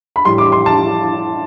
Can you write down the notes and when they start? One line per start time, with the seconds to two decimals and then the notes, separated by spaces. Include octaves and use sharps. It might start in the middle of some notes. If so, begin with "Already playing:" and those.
0.16 B5
0.25 A2 E3 G3 C6
0.38 D6
0.52 C6
0.66 A5